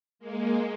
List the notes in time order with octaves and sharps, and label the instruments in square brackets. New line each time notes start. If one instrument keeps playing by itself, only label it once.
[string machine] G#3 A#3